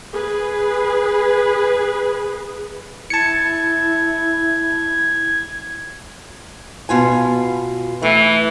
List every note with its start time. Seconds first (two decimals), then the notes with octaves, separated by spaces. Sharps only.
0.12 G#4 B4
3.10 E4 A5 G#6 C#7
6.89 B2 F4 G#5
8.02 E3 A3